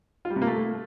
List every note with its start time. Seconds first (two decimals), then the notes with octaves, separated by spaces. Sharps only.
0.25 F4
0.30 G3
0.36 C3
0.42 A#3
0.47 A3